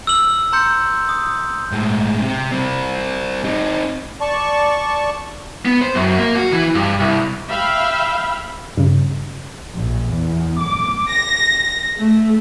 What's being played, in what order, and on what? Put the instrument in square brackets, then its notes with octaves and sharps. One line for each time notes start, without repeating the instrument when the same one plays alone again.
[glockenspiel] E6 F6 F#7
A#5 C6 G6 C#7
D#6
[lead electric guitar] A2 G#3
C3
G3 C4
C4 D#4
[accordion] D5 A5 C#6
[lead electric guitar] B3
C5
F#2
A#3
F#4
E3
G2
C2
[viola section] E5 F5 G5 B5
[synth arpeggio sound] G2 C#3
[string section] A#1
E2
D6
A#6
A3